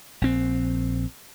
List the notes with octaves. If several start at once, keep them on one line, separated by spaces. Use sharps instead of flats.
A#1 C4